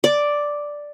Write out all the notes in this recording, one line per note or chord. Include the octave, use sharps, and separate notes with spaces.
D5